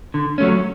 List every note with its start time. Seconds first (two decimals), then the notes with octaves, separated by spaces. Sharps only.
0.14 D3
0.38 F#3 A3 C#4